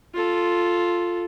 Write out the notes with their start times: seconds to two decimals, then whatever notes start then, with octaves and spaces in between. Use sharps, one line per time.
0.14 F4 A4